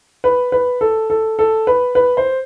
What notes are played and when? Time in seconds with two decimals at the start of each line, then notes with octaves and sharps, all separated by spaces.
0.24 B4
0.52 B4
0.81 A4
1.10 A4
1.39 A4
1.67 B4
1.95 B4
2.17 C5